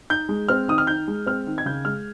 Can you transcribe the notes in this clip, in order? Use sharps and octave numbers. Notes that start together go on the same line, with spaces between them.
D#4 G6
G#3
C4 F6
D#3 D#6
F6
D#4 G6
G#3
C4 F6
D#3
G#6
C#3 G6
G#3 F6